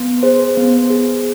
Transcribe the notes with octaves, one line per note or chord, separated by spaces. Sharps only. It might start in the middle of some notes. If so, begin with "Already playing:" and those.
Already playing: B3
G#4 C5
B3
G#4